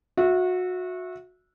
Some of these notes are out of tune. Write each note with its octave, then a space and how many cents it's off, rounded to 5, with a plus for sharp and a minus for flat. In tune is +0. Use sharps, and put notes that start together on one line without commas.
F#4 -25 E5 +0